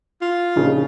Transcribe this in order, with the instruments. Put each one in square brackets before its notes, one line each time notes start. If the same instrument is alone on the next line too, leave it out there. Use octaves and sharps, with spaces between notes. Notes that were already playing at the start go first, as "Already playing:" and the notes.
[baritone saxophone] F4
[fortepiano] A#1 C#3 D#4